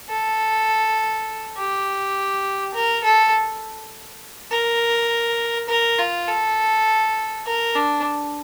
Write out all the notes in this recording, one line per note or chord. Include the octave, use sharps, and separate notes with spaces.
A4
G4
A#4
A4
A#4
A#4
F4
A4
A#4
D4